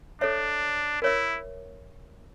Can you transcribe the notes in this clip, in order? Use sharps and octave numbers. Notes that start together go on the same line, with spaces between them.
D4 A4 C#5 E5
E4 A#4 C#5 E5